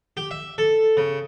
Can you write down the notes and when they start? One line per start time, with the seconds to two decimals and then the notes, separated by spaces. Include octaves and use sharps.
0.17 G4
0.31 E5
0.58 A4
0.97 C#3